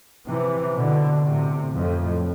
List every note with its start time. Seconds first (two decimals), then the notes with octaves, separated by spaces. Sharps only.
0.28 C3 E3
0.76 B2 D3
1.23 A2 C3
1.71 F2 A2